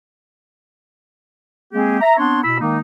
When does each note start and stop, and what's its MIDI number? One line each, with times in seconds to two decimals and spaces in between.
1.73 1.98 56
1.73 1.98 58
1.73 1.98 60
1.73 1.98 67
1.73 1.98 68
2.01 2.15 76
2.01 2.15 82
2.18 2.41 59
2.18 2.41 60
2.18 2.41 62
2.18 2.41 73
2.18 2.41 84
2.43 2.57 47
2.43 2.57 64
2.43 2.57 83
2.43 2.57 88
2.60 2.79 51
2.60 2.79 56
2.60 2.79 58
2.60 2.79 63